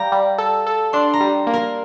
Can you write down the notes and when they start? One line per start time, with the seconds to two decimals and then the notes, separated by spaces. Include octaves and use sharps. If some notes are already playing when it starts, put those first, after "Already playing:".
Already playing: G3 F5 G5 A#5
0.12 G3
0.38 A4
0.67 A4
0.93 D4 C6
1.13 A#5
1.20 G3
1.47 A#3
1.53 A#4